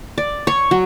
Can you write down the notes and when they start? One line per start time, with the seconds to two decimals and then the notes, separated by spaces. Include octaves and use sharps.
0.18 D5
0.47 C#5
0.71 F#3